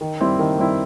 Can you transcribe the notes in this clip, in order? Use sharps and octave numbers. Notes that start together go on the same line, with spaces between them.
D#3
G3 C4 E4
D#3
G3 C4 E4